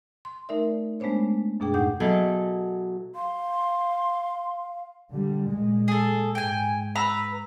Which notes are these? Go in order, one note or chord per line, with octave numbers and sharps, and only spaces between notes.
C6
A3 D#4 A#4 D5 E5
G#3 A3 B3 D4 C5 C#5
F#2 B2 D4 G#4 G5
D#2 A2 D#4 F#5 D6 G6
B2 F#3 E4 G#4 A4
F5 C6
D3 G3
A#2 G#3
G#4 A4
G#2 G5 G#5
B4 A#5 E6